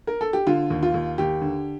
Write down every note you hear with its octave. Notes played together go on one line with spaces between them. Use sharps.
A#4
A4
G4
D3 F4
D#2
F4
D#2
D#2 G4
D3